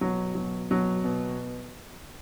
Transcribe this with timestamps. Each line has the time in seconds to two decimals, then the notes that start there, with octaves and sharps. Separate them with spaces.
0.01 B2 F#3
0.35 B2 F#3
0.71 B2 F#3
1.04 B2